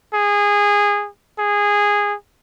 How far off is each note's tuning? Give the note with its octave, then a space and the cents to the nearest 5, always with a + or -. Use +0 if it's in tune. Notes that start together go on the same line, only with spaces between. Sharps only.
G#4 -20
G#4 -15